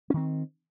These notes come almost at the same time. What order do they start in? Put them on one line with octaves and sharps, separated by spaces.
C#4 D#3 C4